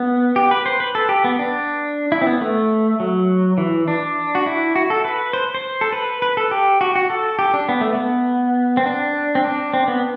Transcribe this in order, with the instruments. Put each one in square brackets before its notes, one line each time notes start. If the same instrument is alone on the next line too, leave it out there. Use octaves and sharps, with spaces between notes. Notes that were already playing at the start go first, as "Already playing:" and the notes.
Already playing: [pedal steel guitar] B3
G4
B4
C5
B4
A4
G4
B3
D4
E4
C4
B3
A3
F#3
E3
D4
F#4
E4
F#4
A4
B4
C5
C5
A4
B4
B4
A4
G4
F#4
F#4
A4
G4
D4
B3
A3
B3
C4
D4
C4
D4
C4
B3